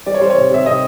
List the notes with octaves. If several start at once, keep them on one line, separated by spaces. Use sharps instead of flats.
G3 D5
C#5
G3 C5
C#5
C3
C3 E5
C3 D#5